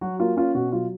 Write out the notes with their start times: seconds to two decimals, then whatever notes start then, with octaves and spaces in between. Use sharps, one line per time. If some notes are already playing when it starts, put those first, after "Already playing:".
0.01 F#3 F#4
0.20 A#3 F4
0.36 C#4 F4
0.55 B2 F#4
0.72 F#3 F4